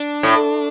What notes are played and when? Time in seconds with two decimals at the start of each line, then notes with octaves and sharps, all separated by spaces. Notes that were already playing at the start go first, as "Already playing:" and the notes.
Already playing: D4
0.23 A2